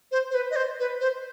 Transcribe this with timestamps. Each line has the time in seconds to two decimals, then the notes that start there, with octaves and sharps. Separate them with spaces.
0.12 C5
0.31 C5
0.35 B4
0.51 D#5
0.56 C5
0.79 B4
1.00 C5